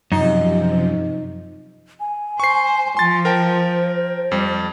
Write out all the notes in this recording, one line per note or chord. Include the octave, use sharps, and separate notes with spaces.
F#2 C3 F3 D#4
G#5
C5 C#6 C7
F3 C6 A6
A#4 C5 G5 A5
F2 G3